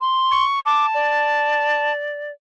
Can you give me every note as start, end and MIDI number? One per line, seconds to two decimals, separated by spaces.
0.01 0.44 84
0.31 0.59 85
0.66 1.92 81
0.66 0.86 86
0.94 2.32 74